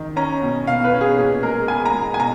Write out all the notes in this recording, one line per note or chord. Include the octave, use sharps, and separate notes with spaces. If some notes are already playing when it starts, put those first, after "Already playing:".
Already playing: D#3
C#4 A#5
B2
B2 F5
B4
C#4
G#4
A#2 G#4
G#3 A#4
B3 G#5
A#5
G#3
G#5
B2 A#5